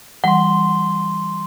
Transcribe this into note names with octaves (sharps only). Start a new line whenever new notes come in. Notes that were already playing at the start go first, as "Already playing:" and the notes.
E3 G3 F#5 C6 G7